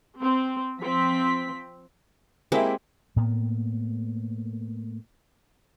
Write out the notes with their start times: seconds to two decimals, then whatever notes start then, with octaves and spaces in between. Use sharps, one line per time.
0.19 C4
0.80 F3 C4 B6
2.52 G#3 A#3 C4 E4 G4 E5
3.16 A2 A#3 B3